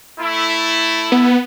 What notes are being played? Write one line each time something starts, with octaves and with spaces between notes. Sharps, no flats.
A3 E4
B3